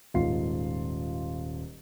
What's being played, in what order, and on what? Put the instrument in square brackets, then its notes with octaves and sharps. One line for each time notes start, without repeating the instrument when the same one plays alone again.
[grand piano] D#1 G#2 F4 C7